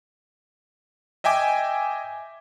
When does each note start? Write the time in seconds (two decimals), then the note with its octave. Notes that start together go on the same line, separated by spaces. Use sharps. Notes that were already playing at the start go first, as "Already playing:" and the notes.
1.24 D#5 E5 G5 G#5 D6